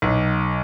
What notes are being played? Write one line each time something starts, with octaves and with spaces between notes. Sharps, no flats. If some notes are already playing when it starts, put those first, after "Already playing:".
B1